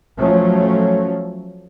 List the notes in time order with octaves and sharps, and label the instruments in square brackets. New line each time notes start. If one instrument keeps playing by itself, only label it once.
[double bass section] F3 F#3 A3 C#4